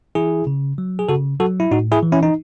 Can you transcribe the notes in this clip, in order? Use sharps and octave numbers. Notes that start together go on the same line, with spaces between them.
E3 E4 G#4
C#3
F#3
G#4
C#3 F#4 A4
F#3 F#4 A4
E4
A2 D#4 F#4
E4 G#4
E3
C#4 E4
D#4